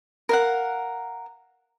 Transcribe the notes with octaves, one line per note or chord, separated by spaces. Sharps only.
A#4 F5 F#5